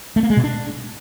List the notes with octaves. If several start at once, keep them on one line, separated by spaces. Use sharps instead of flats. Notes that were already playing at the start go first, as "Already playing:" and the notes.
A3
A#3
G#3
B2
D4